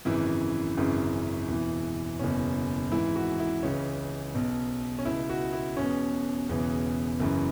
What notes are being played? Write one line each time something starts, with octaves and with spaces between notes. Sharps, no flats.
G#1 F#2 C#3 E3 E4
G#1 F#2 C#3 E3
E1 E2 E3
F#1 E2 B2 C#4
G#1 G#2 E3 E4
F#4
E4
C#2 C#3 E3 C#4
B1 B2
C#4
C#2 B2 E4
F#4
E4
E1 E2 B2 C#4
E1 E2 C#3 E3
F#1 F#2 C#3 E3